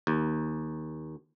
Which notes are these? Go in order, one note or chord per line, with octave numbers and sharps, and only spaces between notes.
D#2